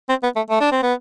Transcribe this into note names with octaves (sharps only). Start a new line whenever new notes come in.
C4
B3
A3
A3
D4
C4
B3